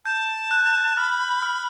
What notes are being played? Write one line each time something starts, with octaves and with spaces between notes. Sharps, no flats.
A5 G6
F#6
B5 F6
F6